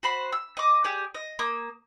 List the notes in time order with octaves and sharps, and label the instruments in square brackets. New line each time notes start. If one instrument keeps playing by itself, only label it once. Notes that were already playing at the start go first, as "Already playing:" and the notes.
[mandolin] F#4 C5 B5
E6
D#5 D6
G4 G#4 D5
D#5
A#3 D#6